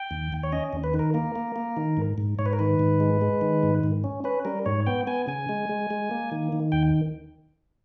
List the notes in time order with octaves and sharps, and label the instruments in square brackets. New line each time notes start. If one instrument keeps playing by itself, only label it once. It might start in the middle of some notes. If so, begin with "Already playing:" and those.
Already playing: [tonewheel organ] G5
D#2
D#2
C#5
C#4 D#5
D#2
B4
D#3
A#4
A#3 A#4
A#3
A#3
D#3
G#2
G#2
G#2 C#5
B4
A#4
D#3 B4
G#2
G#3
G#3
D#3
G#2
G#2
C#4
C#4 B4
G3 A#4
G#2 C#5
B3 G5
B3 G#5
C#3 G#5
G#3
G#3
G#3
A#3
D#3
D#3
D#2 G5